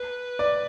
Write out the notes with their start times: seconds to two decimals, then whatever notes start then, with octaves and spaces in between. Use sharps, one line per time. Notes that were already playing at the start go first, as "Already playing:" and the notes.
Already playing: B4
0.39 D5